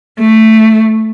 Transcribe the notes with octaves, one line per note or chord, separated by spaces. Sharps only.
A3